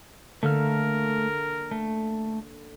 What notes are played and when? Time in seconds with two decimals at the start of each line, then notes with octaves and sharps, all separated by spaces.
0.43 D3 A3 A#3 A4 A#4 F6
1.71 A3